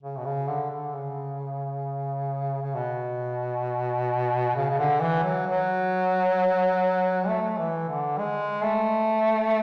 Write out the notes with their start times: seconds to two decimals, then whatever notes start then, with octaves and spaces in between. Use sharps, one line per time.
0.03 C#3
0.18 B2
0.26 C#3
0.48 D3
0.71 D3
0.94 C#3
2.63 C#3
2.75 B2
4.56 C#3
4.70 C#3
4.79 D3
5.01 E3
5.24 F#3
5.46 F#3
7.28 A3
7.58 E3
7.88 D3
8.19 G#3
8.64 A3